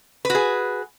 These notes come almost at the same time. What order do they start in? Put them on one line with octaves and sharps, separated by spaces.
B4 F#4 G#4